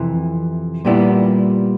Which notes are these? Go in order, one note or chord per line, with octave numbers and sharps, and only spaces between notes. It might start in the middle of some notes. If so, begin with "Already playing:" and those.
Already playing: F2 C3 E3
A#2 G3 B3 E4